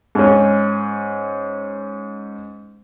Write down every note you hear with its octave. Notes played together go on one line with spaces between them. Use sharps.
G#2 C#4